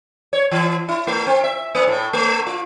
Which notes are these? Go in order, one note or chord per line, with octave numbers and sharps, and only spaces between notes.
C#5
E3
E4
A3
C4
E5
A#3
A2
A3
F4